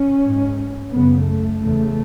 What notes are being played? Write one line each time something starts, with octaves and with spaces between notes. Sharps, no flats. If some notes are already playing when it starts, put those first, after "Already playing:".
Already playing: C#4
G#2
F#2 C#3 B3
A3
E2 C#3